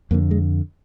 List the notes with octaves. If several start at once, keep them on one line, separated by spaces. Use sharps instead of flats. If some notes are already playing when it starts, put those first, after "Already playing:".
F2 D3 A#3
G#3